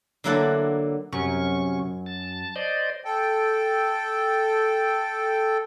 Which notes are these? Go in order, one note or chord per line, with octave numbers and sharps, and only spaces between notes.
D3 F#3 A#3 E4 F#5 A5
F#2 C3 C#4 C#6
A5
C5 D5 D#5
A4 G5